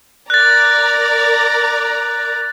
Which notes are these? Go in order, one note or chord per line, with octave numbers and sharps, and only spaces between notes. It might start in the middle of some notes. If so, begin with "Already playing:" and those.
A#4 D5 A#5 F#6 A6